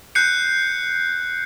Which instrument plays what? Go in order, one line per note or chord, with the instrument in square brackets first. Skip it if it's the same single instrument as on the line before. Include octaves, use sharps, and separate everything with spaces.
[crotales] F#6 G6 C7 C#7